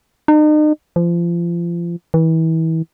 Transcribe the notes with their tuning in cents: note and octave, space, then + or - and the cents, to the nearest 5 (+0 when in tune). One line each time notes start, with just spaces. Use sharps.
D#4 -40
F3 -30
E3 -30